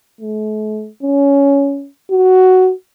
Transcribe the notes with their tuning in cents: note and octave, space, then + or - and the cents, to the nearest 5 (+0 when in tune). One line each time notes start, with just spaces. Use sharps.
A3 -40
C#4 +15
F#4 +5